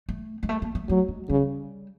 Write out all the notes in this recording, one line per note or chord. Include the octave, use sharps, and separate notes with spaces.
A3
G#3
A3
A#3
A3
F#3 A3
G#3
C#3 G3